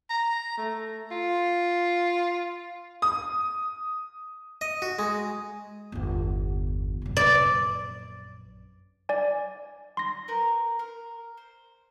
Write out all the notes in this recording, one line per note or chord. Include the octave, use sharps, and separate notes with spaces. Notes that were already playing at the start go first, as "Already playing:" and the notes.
A#5
A3
F4
D#6
D#5
F#4
G#3
G1 E2
F#2 C3
A#1 F#2 D5
D5 G#5
C6 A#6
D#4 A#4 B4
A#4
C5